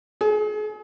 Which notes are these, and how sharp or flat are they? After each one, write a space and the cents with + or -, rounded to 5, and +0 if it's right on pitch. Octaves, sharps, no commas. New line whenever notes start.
G#4 +35